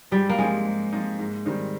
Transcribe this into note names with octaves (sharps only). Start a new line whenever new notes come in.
G#2 G3
A#3
F3 G#3 C4 D#4
G#2
F3 C4 D#4
G#2
D#3 G3 C4 D#4